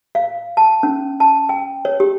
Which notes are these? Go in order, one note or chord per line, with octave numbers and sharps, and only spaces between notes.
F5
A5
C#4
A5
G5
C#5
G4